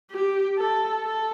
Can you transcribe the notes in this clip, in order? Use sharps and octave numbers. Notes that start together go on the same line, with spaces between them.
G4
A4
A4